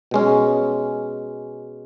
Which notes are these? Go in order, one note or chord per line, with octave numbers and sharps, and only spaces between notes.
B2 G#3 C#4